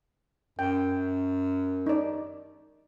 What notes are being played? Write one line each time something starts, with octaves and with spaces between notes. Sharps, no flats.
F#2 G5
D#4 D5